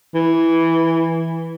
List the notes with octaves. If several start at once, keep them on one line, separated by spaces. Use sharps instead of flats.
E3